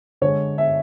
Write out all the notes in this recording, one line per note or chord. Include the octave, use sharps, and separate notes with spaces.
D3 G#3 C#5
E5